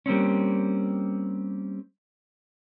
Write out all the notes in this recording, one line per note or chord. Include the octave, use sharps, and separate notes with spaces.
G3 A#3 C4 C#4